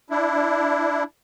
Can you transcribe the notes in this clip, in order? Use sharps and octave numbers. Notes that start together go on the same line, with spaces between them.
D4 E4